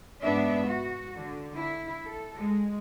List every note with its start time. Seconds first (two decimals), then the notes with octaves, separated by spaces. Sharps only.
0.22 G#2 B3 D4 E5
0.66 F#4
1.16 D3
1.55 E4
2.06 A4
2.36 G#3